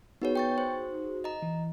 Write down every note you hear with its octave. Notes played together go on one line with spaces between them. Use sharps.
B3 D#4 F#4 G#4 B4 C#5
G5 C#6 A6
C5
D#5 A#5
E3